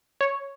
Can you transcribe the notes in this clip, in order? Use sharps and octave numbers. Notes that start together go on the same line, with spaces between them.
C#5